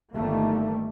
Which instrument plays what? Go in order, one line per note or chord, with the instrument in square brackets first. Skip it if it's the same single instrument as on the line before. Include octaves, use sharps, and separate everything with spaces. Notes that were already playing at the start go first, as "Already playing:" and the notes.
[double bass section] G1 D#3 G3 A3 A#3